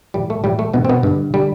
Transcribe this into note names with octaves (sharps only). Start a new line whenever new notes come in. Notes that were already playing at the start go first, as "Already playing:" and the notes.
A2 E3 G3
A3
A2 E3 G3
A3
G2 B2 E3 B3
C4
B2 B3
G2 D3
D3 G3